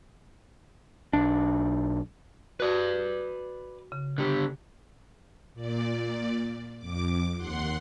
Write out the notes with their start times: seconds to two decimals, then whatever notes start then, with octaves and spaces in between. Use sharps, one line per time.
1.13 B1 D4
2.60 F#4 B4 D5
3.92 C#3
4.18 D3 G4
5.54 A#2 D5
6.78 F2 D6
7.37 D#2 F#5 C6